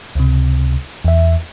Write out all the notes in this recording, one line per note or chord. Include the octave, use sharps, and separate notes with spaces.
C#2 C3
E2 E5